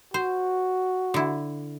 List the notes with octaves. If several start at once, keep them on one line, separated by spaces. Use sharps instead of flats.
F#4 C5
D3 E4